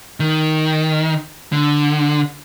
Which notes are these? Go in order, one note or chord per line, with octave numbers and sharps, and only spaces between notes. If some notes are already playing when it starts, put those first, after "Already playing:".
D#3
D3